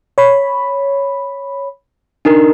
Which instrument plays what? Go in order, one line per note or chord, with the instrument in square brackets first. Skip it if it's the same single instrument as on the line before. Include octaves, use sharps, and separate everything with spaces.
[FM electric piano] C#5 B5
[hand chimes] D4 D#4 A#4